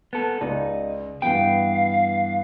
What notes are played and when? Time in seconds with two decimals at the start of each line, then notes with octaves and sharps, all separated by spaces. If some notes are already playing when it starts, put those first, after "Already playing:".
0.13 B3 A4
0.41 C#2 D#4 D5 D#5
1.22 G2 E3 B3 F5 G5